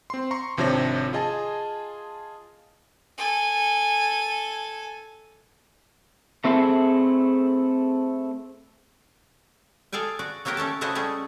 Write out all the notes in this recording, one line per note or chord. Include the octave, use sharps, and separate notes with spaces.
C4 C6
A#5 C6 C#6
G#1 C3 F3 D4 C#5 A#6
F4 G#4 D#5 G#5 A5
A4 G#5
A3 C4 E4 G#4 A4
G#4 A4 F5 G5 G#5
F#4 D5
F#3 A#3 F#4 G4 A#4
A3 C#4 G4 A4
C#3 A3 E4 F#4 C5 D#5
G3 A3 C#4 G#4